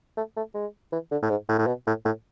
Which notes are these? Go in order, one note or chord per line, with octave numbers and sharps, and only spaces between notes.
A3
A3
G#3
E3
D3
A2
G#2
A2
A2
B2
A2
A2